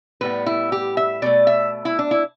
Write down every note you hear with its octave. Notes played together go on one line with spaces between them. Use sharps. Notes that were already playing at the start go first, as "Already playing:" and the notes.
A2 G3 B3 B4
E4
G4
E5
B2 A3 D5
E5
E4
D4
E4